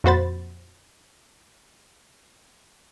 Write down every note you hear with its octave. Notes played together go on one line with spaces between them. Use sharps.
F2 A#2 F#4 C5 B5 A6